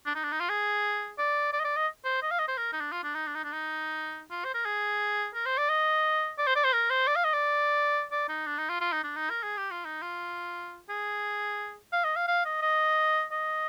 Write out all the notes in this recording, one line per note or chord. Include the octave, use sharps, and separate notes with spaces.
D4
D#4
D4
D#4
F4
G#4
D5
D5
D#5
D5
D#5
C5
D#5
F5
D#5
C5
A#4
D#4
D4
F4
D4
D#4
D4
D#4
D4
D#4
F4
C5
A#4
G#4
A#4
C5
D5
D#5
D5
C5
D5
C5
A#4
C5
D5
F5
D#5
D5
D5
D#4
D4
D#4
F4
F4
D#4
D4
D#4
A#4
G#4
G4
F4
D#4
F4
G#4
F5
D#5
F5
F5
D#5
D#5
D#5